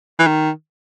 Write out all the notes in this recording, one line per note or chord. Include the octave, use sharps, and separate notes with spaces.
E3
D#3